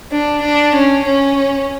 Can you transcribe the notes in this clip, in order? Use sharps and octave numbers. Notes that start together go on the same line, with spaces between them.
D4
D4
C#4
C#4